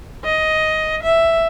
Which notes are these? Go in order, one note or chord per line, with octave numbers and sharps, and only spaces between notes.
D#5
E5